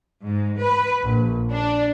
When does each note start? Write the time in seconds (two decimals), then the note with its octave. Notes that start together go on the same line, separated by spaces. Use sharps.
0.25 G#2
0.62 B4
1.03 A#1
1.51 D4